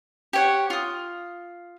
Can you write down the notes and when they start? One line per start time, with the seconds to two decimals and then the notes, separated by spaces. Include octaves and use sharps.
0.33 G4 C#5 F#5
0.70 F4 D#6